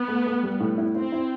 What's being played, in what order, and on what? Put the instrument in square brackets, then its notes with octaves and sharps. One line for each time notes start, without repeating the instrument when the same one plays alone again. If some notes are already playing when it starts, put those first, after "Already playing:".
Already playing: [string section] B3
[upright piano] A3
A3
G3
A2
E4
[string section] C4 [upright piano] E4
[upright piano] E4